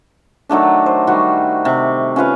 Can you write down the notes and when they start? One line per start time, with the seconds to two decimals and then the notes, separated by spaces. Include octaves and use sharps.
0.49 D#3 F#3 A3 D4
0.86 C5
1.07 D#3 G3 F#4
1.65 C3
2.16 C#4 F4 B4 F5